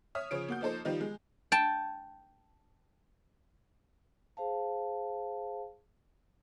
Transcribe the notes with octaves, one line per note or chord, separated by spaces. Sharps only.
C#5 E5 D#6 F6
C#3 F3 C#5 D7
A#3 F#4 G6
F3 A#3 D#4 A4 C5
D#3 F3 G3 D#4 F4
G#3
G5 A5
G#4 C5 F5 A5